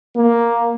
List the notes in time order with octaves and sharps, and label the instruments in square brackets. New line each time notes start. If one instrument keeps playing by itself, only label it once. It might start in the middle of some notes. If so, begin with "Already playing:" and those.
[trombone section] A#3